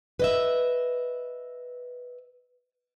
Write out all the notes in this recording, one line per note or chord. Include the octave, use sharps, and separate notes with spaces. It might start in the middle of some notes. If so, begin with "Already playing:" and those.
B4 D#5 E5